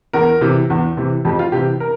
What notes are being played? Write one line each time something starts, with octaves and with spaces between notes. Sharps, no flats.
E2 A#4
C3 E3
E2
C3 E3
F2 G4
F4
C3 E3 G4
A#4